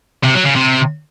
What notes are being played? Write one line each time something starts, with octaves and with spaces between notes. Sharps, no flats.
C3
F#3
C#3
C3